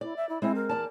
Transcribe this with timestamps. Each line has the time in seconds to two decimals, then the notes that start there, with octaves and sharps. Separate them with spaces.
0.01 E4 D5
0.16 E5
0.29 E4
0.42 G#3 C4 E4
0.55 A#4
0.69 E2 D5 A5